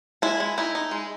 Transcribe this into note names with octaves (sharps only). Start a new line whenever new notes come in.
G#3 E4
G#3
D#4 E4
D#4
G#3